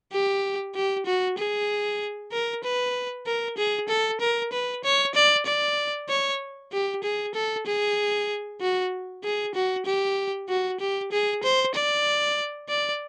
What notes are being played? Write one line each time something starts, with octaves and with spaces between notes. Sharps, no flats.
G4
G4
F#4
G#4
A#4
B4
A#4
G#4
A4
A#4
B4
C#5
D5
D5
C#5
G4
G#4
A4
G#4
F#4
G#4
F#4
G4
F#4
G4
G#4
C5
D5
D5